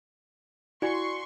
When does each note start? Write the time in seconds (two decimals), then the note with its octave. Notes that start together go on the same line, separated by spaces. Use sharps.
0.82 E4 F#4 D5 G#5 C6 C#6